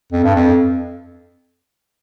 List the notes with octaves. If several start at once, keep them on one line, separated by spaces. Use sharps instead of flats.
F2
G2
F2